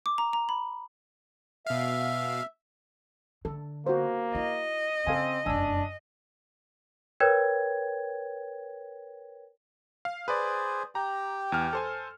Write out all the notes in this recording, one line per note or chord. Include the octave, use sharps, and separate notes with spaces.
D6
A#5
A#5
B5
B2 E5 F5
D3 A4
A#3 F#4 C5
E4 D#5
C#3 C4 A4 F5 G#5
F1 F#2 D4 G#5 E6
A#4 B4 C#5 G5 G#6
F5
G#4 B4 C5 D5
G4 G5 A#5
E2 F6
A4 C5 G#5